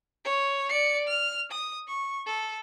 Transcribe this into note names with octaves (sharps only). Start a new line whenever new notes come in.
C#5
D5 C#7
F6
D#6
C#6
A4